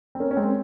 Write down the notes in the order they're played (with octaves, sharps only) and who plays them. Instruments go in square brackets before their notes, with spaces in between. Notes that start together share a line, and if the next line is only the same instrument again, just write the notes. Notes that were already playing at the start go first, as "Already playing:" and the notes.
[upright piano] C4
A#3 C#4
C#4
G#3 C4